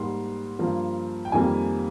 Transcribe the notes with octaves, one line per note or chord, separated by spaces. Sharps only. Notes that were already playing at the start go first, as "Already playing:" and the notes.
Already playing: G#2 G3 A#3 C6
G2 F3 A#3
G5
F2 D#3 G3 A#3 G#5